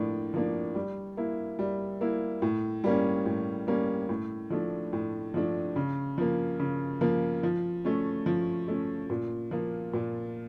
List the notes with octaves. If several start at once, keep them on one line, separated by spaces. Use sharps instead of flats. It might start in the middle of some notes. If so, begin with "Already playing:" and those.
Already playing: A2 F3 A#3 D4
F3 A#3 D4
G3
A#3 E4
G3
A#3 E4
A2
G3 A#3 C#4
A2
G3 A#3 C#4
A2
F3 A3 D4
A2
F3 A3 D4
C#3
F3 A#3
C#3
F3 A#3
F3
A3 C#4
F3
A3 C#4
A#2
F3 A#3
A#2